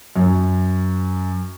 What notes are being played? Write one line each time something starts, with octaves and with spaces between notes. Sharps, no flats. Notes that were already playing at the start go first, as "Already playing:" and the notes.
F#2